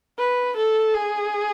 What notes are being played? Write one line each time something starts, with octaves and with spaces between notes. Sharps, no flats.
B4
A4
G#4